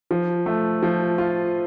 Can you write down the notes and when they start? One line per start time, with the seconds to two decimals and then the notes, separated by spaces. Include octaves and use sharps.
0.11 F3
0.46 A3
0.83 F3
1.18 F4